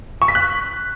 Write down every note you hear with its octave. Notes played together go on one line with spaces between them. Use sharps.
C#6
B6
F#6